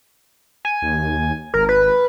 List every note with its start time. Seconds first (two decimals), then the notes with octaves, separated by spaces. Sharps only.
0.65 G#5
0.82 D#2
1.54 G#1 A#4
1.69 B4